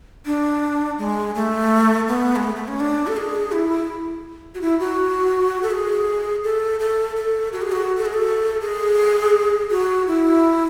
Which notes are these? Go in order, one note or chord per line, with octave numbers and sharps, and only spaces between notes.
D4
G#3
A3
B3
G#3
A3
A3
C#4
D4
A4
G#4
E4
F#4
E4
F#4
A4
G#4
A4
A4
A4
F#4
G#4
F#4
A4
G#4
A4
G#4
F#4
E4